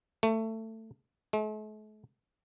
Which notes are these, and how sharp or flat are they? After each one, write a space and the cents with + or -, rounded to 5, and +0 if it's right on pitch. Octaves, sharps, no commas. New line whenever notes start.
A3 +20
A3 -45